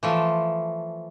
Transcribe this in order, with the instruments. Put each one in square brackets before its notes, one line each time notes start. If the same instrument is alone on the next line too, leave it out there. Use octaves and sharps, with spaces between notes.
[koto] E3 F3 A3